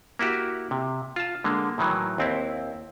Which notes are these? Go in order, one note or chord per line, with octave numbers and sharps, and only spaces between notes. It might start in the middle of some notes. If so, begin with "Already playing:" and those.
A#3 E4 F#4 G4
C3
F4 A5
D3 G#3 A#3
A2 D#3 E3 F#3
D#2 C4 E4